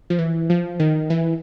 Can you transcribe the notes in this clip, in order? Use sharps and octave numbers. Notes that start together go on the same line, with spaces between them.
F3
E3
F3
D#3
E3